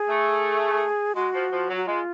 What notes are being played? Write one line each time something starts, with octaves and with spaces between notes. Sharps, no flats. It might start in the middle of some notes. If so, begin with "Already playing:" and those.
Already playing: G#4
A3
G#3 F#4
F3
F3
F#3
F#4
G#3 F4